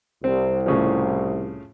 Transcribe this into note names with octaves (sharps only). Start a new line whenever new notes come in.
C2 C4
A2 C#3 F3